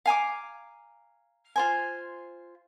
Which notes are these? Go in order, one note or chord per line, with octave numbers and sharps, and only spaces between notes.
F5 G#5 A#5 D6
F4 C5 G#5